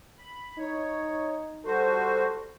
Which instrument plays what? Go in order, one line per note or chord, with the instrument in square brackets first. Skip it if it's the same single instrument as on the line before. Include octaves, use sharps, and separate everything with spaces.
[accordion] B5
[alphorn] D#4 [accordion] C#5
[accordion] G3 F#4 C5 [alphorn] A4